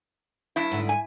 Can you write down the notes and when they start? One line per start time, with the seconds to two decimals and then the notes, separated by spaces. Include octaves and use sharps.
0.56 G2 E4
0.72 G#2 D3
0.89 G#5